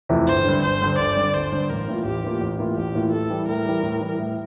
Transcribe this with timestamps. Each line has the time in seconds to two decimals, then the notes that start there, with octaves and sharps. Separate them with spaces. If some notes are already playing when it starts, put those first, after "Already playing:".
0.09 F2 C3 E3 A3
0.28 G1 C5
0.45 G2 D3
0.62 G1 C5
0.81 G2 D3
0.98 G1 D5
1.16 G2 D3
1.34 G1 C5
1.52 G2 D3
1.70 A1 A#4
1.88 A2 E3 A#3 F4
2.05 A1 G4
2.24 A2 E3 A#3 F4
2.41 A1
2.59 A2 E3 A#3 F4
2.77 A1 G4
2.95 A2 E3 A#3 F4
3.12 A2 A4
3.30 E3 G3
3.48 A2 A#4
3.65 E3 G3
3.83 A2
4.01 E3 G3
4.19 A2